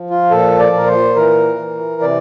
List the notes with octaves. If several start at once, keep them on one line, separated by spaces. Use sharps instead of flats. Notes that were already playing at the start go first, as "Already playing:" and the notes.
Already playing: F3
F4
A#2 A4
D5
A#2 A#4
C5
E3 A#4
E3
C3 D5